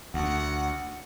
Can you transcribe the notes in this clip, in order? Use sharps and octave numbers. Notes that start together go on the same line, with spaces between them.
D2 F#5